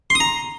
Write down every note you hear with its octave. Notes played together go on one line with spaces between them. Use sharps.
C6
D#6
A#5